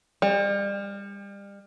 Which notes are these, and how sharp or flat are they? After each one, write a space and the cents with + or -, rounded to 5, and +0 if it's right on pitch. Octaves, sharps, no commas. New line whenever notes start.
G3 +35